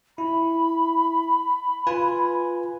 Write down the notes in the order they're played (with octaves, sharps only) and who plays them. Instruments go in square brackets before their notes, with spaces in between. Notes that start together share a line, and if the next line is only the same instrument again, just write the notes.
[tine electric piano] E4 [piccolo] B5
[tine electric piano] F4 B4 G#5